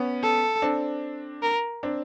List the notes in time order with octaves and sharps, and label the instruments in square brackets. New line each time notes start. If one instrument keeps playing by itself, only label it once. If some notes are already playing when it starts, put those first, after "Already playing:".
Already playing: [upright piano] B3 C#4
[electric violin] A4
[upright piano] C4 D4
[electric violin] A#4
[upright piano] C4 D4